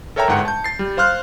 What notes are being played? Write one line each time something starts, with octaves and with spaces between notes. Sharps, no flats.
A4 A#4 C#5 E5 G5 A#5
G1 G#2 F#5 G5 C#7
A5 G6
A6 C7
G3
C5 F5 C6 F6 F#6